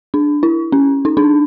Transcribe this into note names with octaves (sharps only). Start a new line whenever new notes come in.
D4
E4
C#4
D#4
D4